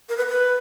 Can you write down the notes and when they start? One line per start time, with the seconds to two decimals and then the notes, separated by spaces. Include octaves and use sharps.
0.09 A#4
0.17 B4
0.28 B4